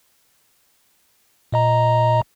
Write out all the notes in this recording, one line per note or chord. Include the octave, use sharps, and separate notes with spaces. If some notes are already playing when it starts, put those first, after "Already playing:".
A#2 D#5 A#5